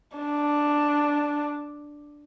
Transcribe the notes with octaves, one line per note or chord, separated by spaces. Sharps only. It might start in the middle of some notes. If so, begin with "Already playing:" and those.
D4